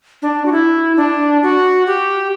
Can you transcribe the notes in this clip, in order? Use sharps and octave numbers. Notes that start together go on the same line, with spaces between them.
D4
F#4
E4
D4
F#4
G4